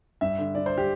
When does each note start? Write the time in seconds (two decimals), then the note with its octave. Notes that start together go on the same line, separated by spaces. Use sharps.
0.21 G2 E5
0.38 D3
0.55 D3 D5
0.66 C5
0.78 G4